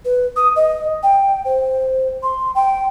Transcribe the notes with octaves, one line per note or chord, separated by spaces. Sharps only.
B4
D#6
D#5
G5
C5
C6
G5